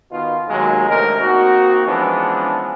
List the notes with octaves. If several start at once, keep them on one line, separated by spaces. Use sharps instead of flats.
B2 D#3 F4
D#2 F#3 G#3
A1 D2 C3 G#3 C#4 A#4
A#3 C4 D#4 F#4
E3 F3 G#3 B3 C#4 D4